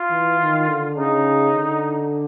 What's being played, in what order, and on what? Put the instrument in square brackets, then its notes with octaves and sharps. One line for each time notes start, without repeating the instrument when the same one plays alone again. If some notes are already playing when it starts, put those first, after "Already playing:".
Already playing: [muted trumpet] F4
[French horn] E3
D#3
D3
[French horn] C#3 [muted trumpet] D#4
[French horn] D3